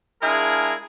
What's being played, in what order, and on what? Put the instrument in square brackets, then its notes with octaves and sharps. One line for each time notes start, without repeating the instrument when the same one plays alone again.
[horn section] G#3 D4 E4 F4 G#4 A#4